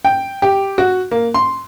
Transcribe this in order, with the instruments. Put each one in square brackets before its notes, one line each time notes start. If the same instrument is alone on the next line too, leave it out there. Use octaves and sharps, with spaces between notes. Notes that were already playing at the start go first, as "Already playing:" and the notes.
[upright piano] G5
G4
F#4
A#3
C6